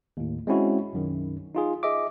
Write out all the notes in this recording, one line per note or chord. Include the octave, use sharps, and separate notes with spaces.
D#2 A2
G#3 C4 C#4 E4 F#4
B1 F#2 D#3
D#4 F4 G#4
G#4 D#5 E5 D6